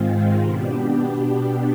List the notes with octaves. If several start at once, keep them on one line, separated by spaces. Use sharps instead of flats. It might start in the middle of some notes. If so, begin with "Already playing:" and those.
Already playing: G#2 D#3 G#3 C4 F4
B2 B3 D4 G4